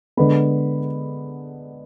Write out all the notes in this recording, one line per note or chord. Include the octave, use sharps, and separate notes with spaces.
D3 G#3 B3 B5